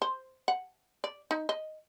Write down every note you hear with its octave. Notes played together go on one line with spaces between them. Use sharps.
C5
F#5
D5
D#4
D#5